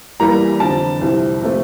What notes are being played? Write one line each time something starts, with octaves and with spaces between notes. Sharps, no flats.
E2 E3 G3 A#3 A#5
F2 D3 F3 A5
C2 C3 F3
C3 F3 A3